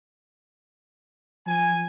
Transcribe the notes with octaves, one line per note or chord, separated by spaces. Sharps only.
F3 G#5